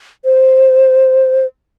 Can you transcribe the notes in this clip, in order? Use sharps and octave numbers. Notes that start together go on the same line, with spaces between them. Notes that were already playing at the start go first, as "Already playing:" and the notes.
C5